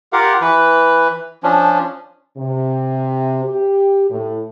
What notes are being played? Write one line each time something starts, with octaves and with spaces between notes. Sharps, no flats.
F4 G4 A#4 F5 F#5
E3 B4
F3 C#4 D4
C3
G4
A2